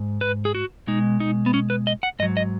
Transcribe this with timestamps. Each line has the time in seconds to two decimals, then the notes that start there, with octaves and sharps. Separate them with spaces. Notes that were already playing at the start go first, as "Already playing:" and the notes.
Already playing: G#2
0.21 B4
0.45 G#4
0.55 F#4
0.87 B2 G#3 D#4
1.20 D#4
1.46 B3
1.54 C#4
1.70 B4
1.87 D#5
2.03 F#5
2.19 G#2 D#5
2.23 F#3
2.37 D#5